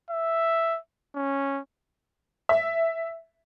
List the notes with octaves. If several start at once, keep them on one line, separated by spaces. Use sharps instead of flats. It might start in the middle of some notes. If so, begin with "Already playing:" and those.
E5
C#4
E5